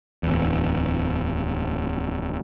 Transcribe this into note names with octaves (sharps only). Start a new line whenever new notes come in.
D1 E2